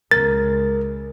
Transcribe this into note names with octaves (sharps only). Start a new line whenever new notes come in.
C#2 G#3 A#4 A6